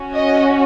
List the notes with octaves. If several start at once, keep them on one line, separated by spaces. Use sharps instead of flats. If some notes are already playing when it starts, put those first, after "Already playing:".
Already playing: C#4 F#4
D#5